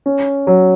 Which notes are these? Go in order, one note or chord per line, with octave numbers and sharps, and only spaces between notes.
C#4
F#3